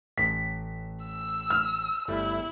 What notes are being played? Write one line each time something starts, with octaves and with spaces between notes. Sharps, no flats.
A1 B6
E6
F6
G1 G3 A3 E4